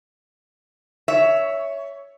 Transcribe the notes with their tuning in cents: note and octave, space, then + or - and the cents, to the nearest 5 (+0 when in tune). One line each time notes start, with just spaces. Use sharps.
C#5 +15 E5 +0